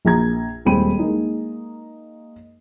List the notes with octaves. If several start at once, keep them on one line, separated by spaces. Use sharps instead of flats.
A#1 A#5 G#6
D#1 G#3 C4 G5 B5 D#7
G#3 A#3 D#4